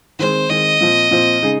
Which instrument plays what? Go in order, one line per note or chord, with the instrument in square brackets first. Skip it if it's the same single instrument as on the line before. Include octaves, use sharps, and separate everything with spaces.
[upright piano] D#3 G#3 C4 [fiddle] C5
[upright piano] D#3 G#3 C4 [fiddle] D#5
[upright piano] A#2 F3 C4
A#2 F3 C4
C#3 G#3 D#4 G#4